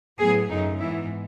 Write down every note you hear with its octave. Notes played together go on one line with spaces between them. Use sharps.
A2 F#3 B3 G#4
F#2 C#3 F#3 A3 D#4
G#2 E3 B3 E4